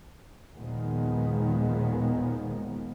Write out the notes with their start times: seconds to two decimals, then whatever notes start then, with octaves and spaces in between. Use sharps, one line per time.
0.54 D#2 A#2 D#3 F3 G#3 B3